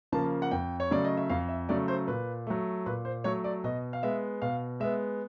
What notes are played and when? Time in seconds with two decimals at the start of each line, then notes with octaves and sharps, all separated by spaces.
0.12 C#3 F3 A#3 A5
0.42 F#5
0.51 F2 G5
0.80 C#5
0.90 C#3 F#3 A3 D5
1.05 D#5
1.17 E5
1.30 F2 F5
1.49 E5
1.69 C#3 F#3 A3 D5
1.88 C5
2.08 A#2 B4
2.47 F#3 A3
2.86 A#2 B4
3.05 C5
3.24 F#3 A3 C#5
3.44 D5
3.64 B2 D#5
3.93 F5
4.03 G#3 B3 E5
4.42 B2 F5
4.80 G#3 B3 E5